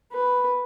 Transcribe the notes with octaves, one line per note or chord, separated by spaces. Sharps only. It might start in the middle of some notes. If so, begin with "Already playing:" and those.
B4